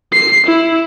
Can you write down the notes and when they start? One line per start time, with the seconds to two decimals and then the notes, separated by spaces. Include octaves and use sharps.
0.13 C7
0.47 E4